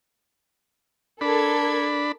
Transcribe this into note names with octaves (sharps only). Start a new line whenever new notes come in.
D4 A4 A#4 B5 G#6